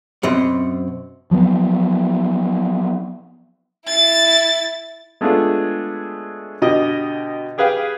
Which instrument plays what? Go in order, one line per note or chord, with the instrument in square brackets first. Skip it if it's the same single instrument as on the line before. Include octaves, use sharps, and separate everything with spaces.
[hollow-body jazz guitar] F#2 B2 C4 C#5
[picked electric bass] F3 F#3 B3
[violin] E4 A6
[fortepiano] G#3 A3 B3 D4 F4 G#4
B2 D3 G4 D#5 D#6
G4 G#4 B4 F5 G5